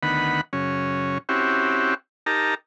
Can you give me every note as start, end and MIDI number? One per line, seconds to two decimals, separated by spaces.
0.03 0.41 38
0.03 0.41 51
0.03 0.41 59
0.03 0.41 78
0.03 0.41 83
0.53 1.18 42
0.53 1.18 49
0.53 1.18 61
1.29 1.94 60
1.29 1.94 61
1.29 1.94 64
1.29 1.94 66
1.29 1.94 67
2.26 2.55 63
2.26 2.55 67
2.26 2.55 70
2.26 2.55 81
2.26 2.55 82